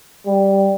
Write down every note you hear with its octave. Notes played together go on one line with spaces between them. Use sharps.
G3